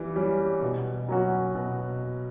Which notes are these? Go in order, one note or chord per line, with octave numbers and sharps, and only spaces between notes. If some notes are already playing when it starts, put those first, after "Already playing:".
Already playing: E3 G3
G3 C#4
B2
F#3 C#4 F#4
B2